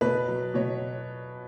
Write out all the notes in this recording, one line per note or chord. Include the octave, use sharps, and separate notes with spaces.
B2 B4
F#3
B2 C#5